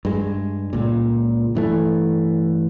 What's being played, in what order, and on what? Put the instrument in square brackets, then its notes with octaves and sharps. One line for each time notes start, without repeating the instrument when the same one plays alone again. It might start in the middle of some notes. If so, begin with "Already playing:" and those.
[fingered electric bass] G2 G#3
C#2 A#2
G2 E3 A3